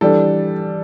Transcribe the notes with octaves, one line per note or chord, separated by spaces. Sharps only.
E3 G3 D4 A4